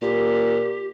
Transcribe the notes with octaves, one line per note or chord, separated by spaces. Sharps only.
A#2 G4